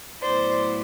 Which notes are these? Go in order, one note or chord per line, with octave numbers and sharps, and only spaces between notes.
A2 F#3 B3 E4 C5 D5